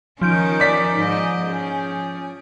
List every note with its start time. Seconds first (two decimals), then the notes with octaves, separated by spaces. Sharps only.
0.21 D#3 F3 C#4 D#4 G6 D7
0.60 D5 B6
0.99 G#2 D#5
1.45 C#4 G#4